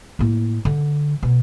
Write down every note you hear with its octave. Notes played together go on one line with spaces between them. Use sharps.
A2 A#3
D3
B2